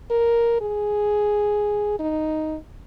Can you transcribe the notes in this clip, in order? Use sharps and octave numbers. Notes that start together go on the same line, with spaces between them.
A#4
G#4
D#4